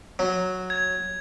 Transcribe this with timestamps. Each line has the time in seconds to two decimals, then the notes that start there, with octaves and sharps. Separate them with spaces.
0.19 F#3
0.70 G#6